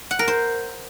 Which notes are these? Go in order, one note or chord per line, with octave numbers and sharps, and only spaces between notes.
F#5
A#4
C5